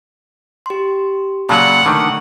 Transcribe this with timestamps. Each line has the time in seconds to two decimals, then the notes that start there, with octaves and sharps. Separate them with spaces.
0.66 G4 C6
1.49 A#2 C#3 F#3 F#5 A5 B5 F6
1.86 D3 D#3 A3 C#6